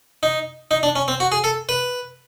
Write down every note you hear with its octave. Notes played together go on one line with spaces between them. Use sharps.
D#4
D#4
D4
C#4
C4
F#4
G#4
A4
B4